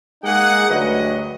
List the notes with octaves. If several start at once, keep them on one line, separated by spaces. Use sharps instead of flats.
G#3 A#3 D#4 G#4 F#5
D2 G2 F#3 B4 D#5